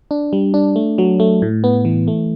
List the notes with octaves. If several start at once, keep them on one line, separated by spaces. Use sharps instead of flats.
D4
G3
D4
A3
F#3
A3
A2
B3
E3
A3